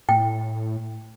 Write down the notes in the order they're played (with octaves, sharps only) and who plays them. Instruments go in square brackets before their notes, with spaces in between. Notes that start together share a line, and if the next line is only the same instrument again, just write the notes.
[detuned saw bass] A2 [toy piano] G5